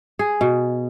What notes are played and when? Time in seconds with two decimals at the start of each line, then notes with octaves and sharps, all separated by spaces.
0.19 G#4
0.41 B2